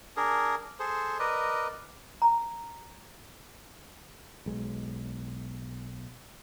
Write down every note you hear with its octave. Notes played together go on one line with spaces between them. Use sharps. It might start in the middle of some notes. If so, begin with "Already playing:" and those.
D4 G#4 A#4
G#4 A4 C5
A#4 B4 D5 D#5
A#5
B1 G#3